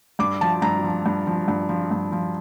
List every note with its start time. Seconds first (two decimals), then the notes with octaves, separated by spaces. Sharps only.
0.19 G2 D6
0.41 F3 A5
0.62 G2 A#5
0.84 F3
1.06 G2
1.27 F3
1.48 G2
1.69 F3
1.91 G2
2.12 F3